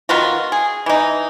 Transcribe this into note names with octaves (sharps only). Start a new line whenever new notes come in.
D#3 B3 F4 F#4
G#4
E3 D#4